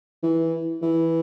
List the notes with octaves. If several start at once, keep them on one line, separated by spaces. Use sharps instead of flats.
E3
E3